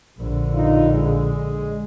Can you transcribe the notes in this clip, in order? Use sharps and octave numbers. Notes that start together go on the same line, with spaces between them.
A#1 D3
D#4 F4
G#3